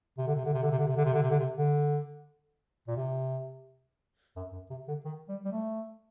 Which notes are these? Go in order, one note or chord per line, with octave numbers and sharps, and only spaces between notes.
C3
D3
C3
D3
C3
D3
C3
D3
C3
D3
C3
D3
C3
D3
C3
D3
A#2
C3
F#2
F#2
C3
D3
D#3
G3
G3
A3